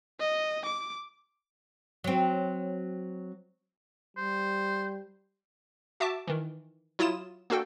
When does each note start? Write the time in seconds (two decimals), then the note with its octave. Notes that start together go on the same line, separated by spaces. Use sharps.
0.20 D#5
0.66 D6
2.04 F#3 C4
4.17 G3 C5
6.00 F#4 E5 A5 D6
6.27 D#3 E3
6.99 F#3 E4 F4 D#6 E7
7.50 A#3 D4 F#4 A4 G5